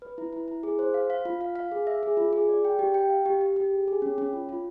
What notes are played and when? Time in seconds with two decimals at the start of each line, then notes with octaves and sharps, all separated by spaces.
0.02 B4
0.18 E4
0.33 E4
0.48 E4
0.63 G#4
0.79 C5
0.94 F5
1.10 F5
1.25 F4
1.41 F5
1.56 F5
1.72 G#4
1.87 E5
2.03 G#4
2.17 F4
2.33 G#4
2.49 D5
2.65 G5
2.79 G4
2.94 G5
3.10 F5
3.26 G4
3.41 G4
3.56 G4
3.72 G#4
3.88 G#4
4.02 C#4
4.18 C#4
4.33 F4
4.49 F4